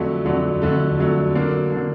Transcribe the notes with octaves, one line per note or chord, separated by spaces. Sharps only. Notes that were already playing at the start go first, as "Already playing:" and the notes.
Already playing: F2 D3 F#3 A3
F2 D3 F#3 A3
F2 D3 F#3 A3
F2 D3 F#3 A3
D3 F#3 A#3 D4
D3 F#3 A#3 D4